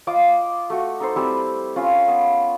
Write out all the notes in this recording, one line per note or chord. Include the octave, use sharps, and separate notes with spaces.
F4 D#5 F5 D6
A3 F#4
D#4 A4 C5
G3 C4 E4 E6
C#4 F4
B3